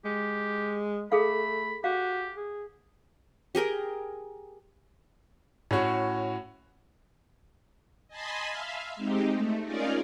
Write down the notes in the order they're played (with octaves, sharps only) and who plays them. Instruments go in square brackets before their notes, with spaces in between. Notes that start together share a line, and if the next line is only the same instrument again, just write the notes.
[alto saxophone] G#3 [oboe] G4
[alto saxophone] A3 [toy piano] G#4 A4 F5 [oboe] B5
[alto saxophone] F#4 [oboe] G4 [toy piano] F5
[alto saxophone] G#4
[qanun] G4 G#4 A#4 G5
[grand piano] A2 C#4 F#4
[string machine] D#5 G#5 A5 B5 C6
E5 F5
G#3 C4 D#4 G4
A3
C#4 D#4 F4 G#4 A#4 D5